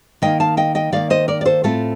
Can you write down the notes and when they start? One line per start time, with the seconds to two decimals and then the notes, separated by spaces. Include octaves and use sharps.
0.22 D#3 A#3 D#5 G5
0.40 F5 A5
0.57 D#5 G5
0.75 D#5 G5
0.92 D#3 A#3 D5 F5
1.10 C5 D#5
1.28 A#4 D5
1.41 D5
1.45 A4 C5
1.64 A2 A3 C4 F4 A4